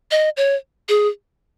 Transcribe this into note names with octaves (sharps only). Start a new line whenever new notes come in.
D#5
C#5
G#4